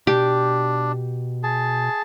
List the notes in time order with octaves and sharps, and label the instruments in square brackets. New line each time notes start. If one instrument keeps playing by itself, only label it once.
[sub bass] B2 [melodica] D4 [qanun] G4
[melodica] G#4 A5